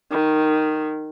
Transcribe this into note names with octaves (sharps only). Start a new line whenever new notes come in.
D#3